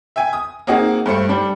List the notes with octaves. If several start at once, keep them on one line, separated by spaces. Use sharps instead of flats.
E5 G5 G#5
D#6
A#3 C4 D#4 F#4 G#4
G2 A3 C5 C#7
G3 D4